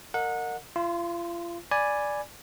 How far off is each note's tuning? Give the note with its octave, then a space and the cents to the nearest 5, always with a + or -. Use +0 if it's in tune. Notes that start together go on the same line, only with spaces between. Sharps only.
A#4 -25 D#5 -10 F#5 -25
F4 -35 C6 +0
D5 +0 G#5 +0 B5 +0